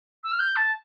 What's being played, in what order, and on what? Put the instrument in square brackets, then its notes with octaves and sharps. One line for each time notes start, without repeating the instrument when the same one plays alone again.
[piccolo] E6
F6
G6
A5